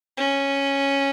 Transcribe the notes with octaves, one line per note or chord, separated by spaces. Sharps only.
C#4